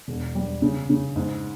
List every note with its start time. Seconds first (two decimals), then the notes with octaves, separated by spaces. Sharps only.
0.08 E1
0.35 G3
0.62 C#3
0.90 C#3
1.16 G#2